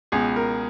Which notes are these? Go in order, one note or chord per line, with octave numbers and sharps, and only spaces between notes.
C#2 B2 G#4
A#4